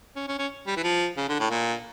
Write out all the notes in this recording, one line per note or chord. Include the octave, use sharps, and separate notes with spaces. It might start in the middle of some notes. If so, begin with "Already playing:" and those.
C#4
C#4
C#4
G3
E3
F3
C#3
D3
A2
A#2